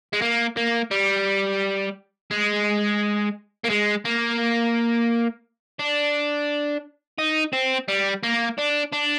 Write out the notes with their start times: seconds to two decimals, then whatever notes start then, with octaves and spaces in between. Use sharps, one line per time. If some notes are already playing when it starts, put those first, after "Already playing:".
0.13 G#3
0.22 A#3
0.57 A#3
0.91 G3
2.31 G#3
3.65 A#3
3.70 G#3
4.05 A#3
5.79 D4
7.18 D#4
7.53 C4
7.88 G3
8.23 A#3
8.58 D4
8.92 D4